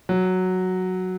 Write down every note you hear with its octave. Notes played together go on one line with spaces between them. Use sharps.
F#3